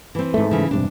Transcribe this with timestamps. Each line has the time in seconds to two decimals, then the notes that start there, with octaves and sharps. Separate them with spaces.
0.15 E3 C4
0.34 G#2 A3
0.51 C#3 E3
0.71 E1 G2 C3 D4